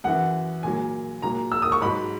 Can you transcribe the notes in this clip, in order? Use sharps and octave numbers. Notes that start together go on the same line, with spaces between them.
F#2 E3 F#5
A#2 F#3 G#5
A#2 F#3 A#5
E6
D#6
C#6
G#2 F#3 B5